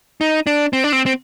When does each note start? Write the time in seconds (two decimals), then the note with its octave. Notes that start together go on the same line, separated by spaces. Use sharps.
0.21 D#4
0.47 D4
0.73 C4
0.84 D4
0.92 C4
1.06 C4